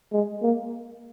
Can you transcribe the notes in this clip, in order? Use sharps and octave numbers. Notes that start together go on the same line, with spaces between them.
G#3
A#3